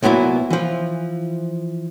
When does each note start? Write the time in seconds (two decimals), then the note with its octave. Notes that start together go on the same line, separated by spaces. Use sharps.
0.03 C2 A#2 F#3 B3 E4
0.50 E3 F3